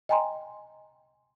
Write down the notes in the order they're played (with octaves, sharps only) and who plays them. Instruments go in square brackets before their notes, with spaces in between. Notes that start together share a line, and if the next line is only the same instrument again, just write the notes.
[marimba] D#5 G5 G#5 A#5 C6